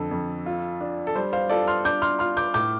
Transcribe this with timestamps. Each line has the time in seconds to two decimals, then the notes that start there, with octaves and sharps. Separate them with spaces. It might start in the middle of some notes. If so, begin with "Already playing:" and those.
Already playing: F2 D3 A4
0.11 F2
0.46 F4
0.81 D4
1.07 A4
1.15 G3 C5
1.33 C5 F5
1.49 F4 A4 D5
1.67 C6 F6
1.85 D4 D6 G6
2.02 C6 F6
2.19 F4 C6 F6
2.37 D6 G6
2.54 A2 D6 G6